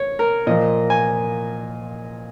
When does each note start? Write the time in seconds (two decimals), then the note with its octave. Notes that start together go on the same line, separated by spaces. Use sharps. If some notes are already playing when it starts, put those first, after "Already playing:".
Already playing: C#5
0.19 A#4
0.47 A#2 F3 A#3 D#5
0.90 G#5